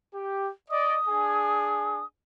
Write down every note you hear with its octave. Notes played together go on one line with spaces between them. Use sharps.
G4
D5 D#5 D#6
D4 G#4 G#5